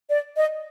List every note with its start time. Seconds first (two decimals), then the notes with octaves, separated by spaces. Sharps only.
0.09 D5
0.37 D#5